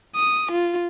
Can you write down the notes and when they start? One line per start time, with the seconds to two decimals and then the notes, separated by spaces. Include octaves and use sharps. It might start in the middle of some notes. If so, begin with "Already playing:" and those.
0.16 D#6
0.52 F4